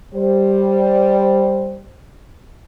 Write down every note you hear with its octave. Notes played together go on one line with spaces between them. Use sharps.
G3 C5